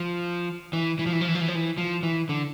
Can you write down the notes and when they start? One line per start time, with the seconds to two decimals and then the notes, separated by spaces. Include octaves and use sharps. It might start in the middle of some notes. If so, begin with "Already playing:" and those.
Already playing: F3
0.73 E3
0.99 E3
1.07 F3
1.13 E3
1.21 F3
1.28 E3
1.35 F3
1.41 E3
1.48 F3
1.55 E3
1.78 F3
2.03 E3
2.29 D3